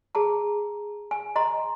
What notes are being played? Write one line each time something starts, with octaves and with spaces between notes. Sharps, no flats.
G#4 A5 A#5
G#5
D#5 A#5 C6